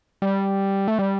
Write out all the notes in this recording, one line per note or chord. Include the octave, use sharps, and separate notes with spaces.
G3
A3
G3